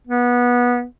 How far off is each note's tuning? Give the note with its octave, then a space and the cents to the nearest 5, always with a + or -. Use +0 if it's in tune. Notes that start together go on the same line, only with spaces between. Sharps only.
B3 -20